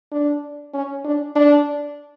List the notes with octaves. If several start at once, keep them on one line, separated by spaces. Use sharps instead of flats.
D4
C#4
D4
D4